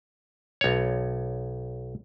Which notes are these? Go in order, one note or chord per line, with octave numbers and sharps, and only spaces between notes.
B1 C#5